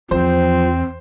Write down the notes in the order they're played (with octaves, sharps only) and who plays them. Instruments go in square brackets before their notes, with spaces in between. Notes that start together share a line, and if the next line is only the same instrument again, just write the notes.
[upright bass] E2 [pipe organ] F3 [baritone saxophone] C4 [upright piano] C5